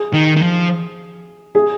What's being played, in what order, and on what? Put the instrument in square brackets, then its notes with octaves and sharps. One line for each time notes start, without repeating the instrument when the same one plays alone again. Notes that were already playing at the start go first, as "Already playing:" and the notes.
Already playing: [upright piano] G#4
[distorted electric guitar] D#3
D#3
F3
[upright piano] G#4